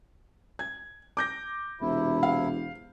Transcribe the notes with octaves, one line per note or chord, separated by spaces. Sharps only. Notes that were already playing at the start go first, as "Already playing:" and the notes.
G#6
D6 G6 A#6
E1 C3 E4
F5